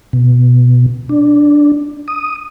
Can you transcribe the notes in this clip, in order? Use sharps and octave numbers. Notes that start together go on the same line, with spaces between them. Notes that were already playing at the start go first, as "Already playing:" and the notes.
B2
D4
D#6